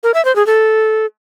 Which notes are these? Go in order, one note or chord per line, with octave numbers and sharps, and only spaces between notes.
A#4
E5
C5
G#4
A4